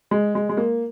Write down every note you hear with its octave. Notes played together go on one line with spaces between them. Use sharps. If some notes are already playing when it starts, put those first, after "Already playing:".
G#3
G#3
G#3
A#3